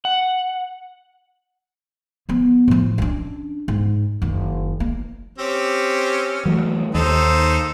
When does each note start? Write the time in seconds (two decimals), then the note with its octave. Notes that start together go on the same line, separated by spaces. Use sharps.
0.05 F#5
2.29 F3 B3
2.68 A2 F3
2.98 C#4 D4
3.68 G#2
4.22 F#1 D#3
4.80 A#3
5.38 C4 C#4 G4
6.46 E3 F#3 A3
6.95 D#2 D#4 A4 C5